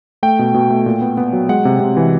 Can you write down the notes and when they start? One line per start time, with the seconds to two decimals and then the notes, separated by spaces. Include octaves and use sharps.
0.23 A3 G5
0.39 B2
0.54 B2
0.70 A3
0.86 A#2
1.01 B3
1.17 B3
1.33 F#3
1.49 G#3 F#5
1.65 C3
1.80 C3
1.97 E3